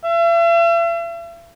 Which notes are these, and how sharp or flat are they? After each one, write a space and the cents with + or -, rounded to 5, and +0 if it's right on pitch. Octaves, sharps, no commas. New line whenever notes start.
E5 +45